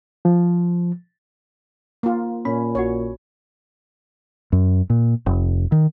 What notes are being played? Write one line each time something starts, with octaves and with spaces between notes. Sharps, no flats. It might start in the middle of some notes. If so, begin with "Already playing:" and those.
F3
A#3 F4
A#2 C#4 B5
A#1 F#4 C#5
F#2
A#2
F1
D#3